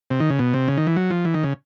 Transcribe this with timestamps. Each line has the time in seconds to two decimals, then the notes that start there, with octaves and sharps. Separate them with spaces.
0.10 C3
0.20 D#3
0.30 C#3
0.39 B2
0.54 C3
0.68 C#3
0.77 D#3
0.87 E3
0.96 F#3
1.10 F3
1.25 E3
1.34 D#3
1.44 C#3